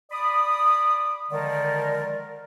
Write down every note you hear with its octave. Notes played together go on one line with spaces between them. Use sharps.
D5 B5 D6 D#6
D3 D#3 F3 G#3 A#4 D5